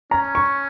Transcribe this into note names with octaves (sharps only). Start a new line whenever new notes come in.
C#4 A#5
C#6